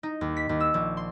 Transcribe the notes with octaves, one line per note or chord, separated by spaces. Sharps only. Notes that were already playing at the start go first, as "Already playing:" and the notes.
D#4
D#2
B6
D#2
E6
A#1
C6